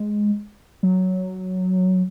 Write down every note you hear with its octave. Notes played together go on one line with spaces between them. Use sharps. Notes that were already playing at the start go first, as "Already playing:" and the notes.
Already playing: G#3
F#3